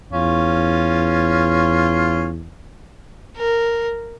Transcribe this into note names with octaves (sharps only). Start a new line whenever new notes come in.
E2 C#4 F4
A#4